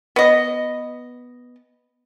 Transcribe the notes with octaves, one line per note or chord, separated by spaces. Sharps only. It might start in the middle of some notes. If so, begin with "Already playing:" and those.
B3 D#5